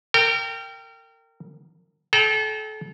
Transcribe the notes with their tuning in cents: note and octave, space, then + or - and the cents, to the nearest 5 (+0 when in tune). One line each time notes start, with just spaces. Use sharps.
A#4 -35 G5 +0
A4 -35 G5 +0 A#5 +0